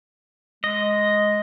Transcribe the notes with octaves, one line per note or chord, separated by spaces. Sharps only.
G#3 D#5